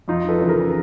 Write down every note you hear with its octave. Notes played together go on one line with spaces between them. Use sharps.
F2 D#4 F4
A4 B4
C#3 E3
G#4 A#4